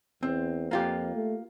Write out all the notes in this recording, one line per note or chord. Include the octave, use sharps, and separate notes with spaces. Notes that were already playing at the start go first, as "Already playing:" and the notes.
E2 C4
F2 A#3 F4 G4
A3